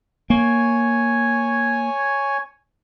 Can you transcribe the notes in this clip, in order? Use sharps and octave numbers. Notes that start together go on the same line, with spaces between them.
A#3 C#5 G#5